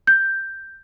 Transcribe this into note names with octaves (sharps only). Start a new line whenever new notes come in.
G6